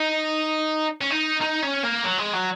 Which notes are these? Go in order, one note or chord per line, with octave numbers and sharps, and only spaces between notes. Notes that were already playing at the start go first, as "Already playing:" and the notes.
Already playing: D#4
C#4
D#4
D#4
C#4
A#3
F#3
G#3
F#3